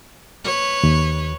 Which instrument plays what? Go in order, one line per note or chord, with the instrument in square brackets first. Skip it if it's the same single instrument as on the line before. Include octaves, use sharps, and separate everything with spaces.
[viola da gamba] B4 C#5
[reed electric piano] D#2